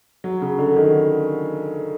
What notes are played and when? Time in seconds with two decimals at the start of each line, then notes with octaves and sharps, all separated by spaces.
0.24 F#3
0.42 C#3
0.58 D3
0.76 D#3